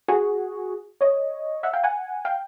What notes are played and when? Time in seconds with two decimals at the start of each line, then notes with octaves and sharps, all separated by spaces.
0.08 F#4 G#4
1.01 C#5 D#5
1.63 E5 F#5
1.73 F5 G5
1.83 F#5 G#5
2.25 F5 G5